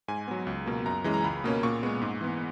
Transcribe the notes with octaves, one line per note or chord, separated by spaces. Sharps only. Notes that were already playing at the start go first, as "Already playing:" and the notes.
G#2 G#5
F#3 B3
C#2
B2 A#3
F#2 A#5
E3 G#3 C#4
A#5
C#2 B5
B2 A#3 C#4
A#2 C#6
G#3 B3
G#2
E3 B3